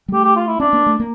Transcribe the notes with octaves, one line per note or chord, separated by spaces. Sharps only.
G3
A3 G4
G4
F4
E4
C#4 D4
A#3
A3
A#3